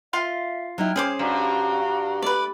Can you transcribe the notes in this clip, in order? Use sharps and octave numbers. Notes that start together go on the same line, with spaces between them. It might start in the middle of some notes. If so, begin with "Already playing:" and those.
F4 E5 F5 C6
F#3 D#4 E4 G5 F6 G#6
C#4 G#4 C5 D6
G2 F#4 F5 A#5
A3 B4 D5